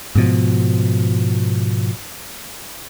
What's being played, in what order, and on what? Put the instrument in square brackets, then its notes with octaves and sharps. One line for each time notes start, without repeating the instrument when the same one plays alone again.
[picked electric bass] G#2 B2 F3